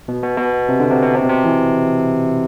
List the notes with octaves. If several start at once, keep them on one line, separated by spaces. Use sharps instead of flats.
B2
B2
B2
C3
D3
C3
B2
C3
B2
C3
E3